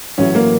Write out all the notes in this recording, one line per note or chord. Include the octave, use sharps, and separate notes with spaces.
A1 A2 F#3 C#4
A#3